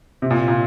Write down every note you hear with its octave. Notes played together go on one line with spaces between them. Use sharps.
C3
A#2
A#2